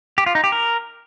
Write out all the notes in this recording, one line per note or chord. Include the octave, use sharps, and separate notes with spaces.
G4
F4
D#4
G4
A#4